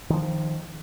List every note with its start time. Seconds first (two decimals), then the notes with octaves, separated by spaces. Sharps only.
0.10 D#3 F3